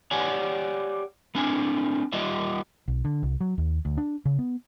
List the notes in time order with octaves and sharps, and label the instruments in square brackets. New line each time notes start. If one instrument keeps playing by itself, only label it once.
[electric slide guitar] G4 C#5 D5 F#5 G#5
A3 C4 D4 G#5
G3 F4 D#5 E5
[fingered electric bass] B1
D3
C2
F#3
D#2
D2
D4
C#3
B3